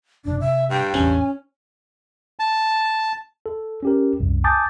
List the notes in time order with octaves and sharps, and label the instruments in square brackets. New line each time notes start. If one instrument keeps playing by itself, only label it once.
[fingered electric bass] G1 F#2 C3 [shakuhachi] D4
[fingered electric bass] C3 [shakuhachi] E5
[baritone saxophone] G2 [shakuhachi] G5
[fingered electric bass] A1 E2 [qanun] C#4 [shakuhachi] G#5
[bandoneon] A5
[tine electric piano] A4
C#4 G4 A#4
C2 F#2
G#5 A5 D6 D#6 G6 A6